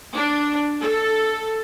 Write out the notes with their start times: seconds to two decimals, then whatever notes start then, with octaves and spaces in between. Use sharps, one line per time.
0.15 D4
0.79 A4